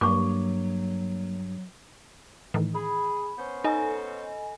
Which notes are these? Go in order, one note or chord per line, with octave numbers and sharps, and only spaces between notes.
G2 F#3 A#3 C#6 D6
A2 D#3 E3
G#4 B5
B3 C#4 C5
D#4 A4 D#5 G#5